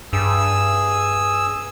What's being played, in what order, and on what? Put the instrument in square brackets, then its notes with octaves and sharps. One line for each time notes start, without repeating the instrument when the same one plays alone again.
[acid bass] G2 [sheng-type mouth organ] G#4 E6